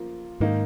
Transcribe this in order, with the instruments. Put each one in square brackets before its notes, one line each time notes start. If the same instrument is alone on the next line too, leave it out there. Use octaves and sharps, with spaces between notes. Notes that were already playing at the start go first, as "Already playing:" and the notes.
Already playing: [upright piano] F3 A#3 F4
[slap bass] G#2 [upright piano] D#3 A#3 D#4